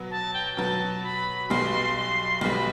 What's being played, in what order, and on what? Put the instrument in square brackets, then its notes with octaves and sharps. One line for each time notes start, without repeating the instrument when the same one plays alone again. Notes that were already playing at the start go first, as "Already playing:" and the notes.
Already playing: [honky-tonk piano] B2 F#3 B3
[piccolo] A5
G5
G5
[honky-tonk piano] B2 F#3 B3 [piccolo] A5
[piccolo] B5
[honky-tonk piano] B1 B2 G3 [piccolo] C6
[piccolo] C6
[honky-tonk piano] B1 B2 G3 [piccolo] B5